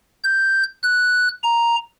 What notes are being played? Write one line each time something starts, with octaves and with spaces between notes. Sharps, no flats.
G6
F#6
A#5